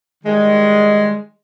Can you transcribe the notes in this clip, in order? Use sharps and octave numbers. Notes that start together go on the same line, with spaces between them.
D#3 G3 G#3